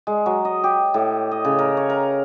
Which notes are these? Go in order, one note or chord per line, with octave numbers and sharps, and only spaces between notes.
G#3
F#3
D#5
G4
A2
D#5
C#3
A#4
C#5
A#4